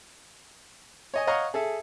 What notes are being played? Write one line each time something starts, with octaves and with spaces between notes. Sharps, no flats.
C#5 D#5 G#5
C#5 D#5 F5 F#5 A#5 C#6
G#4 A4 E5